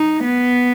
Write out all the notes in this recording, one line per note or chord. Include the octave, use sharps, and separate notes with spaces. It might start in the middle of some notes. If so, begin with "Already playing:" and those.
Already playing: D#4
B3